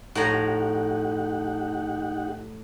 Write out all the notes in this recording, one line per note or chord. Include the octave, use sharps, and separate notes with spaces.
A2 F3 D#4 G4 F#5 A#5